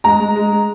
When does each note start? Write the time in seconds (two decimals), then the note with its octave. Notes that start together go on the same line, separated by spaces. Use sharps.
0.04 G#3 A#5
0.20 G#3
0.36 G#3
0.52 G#3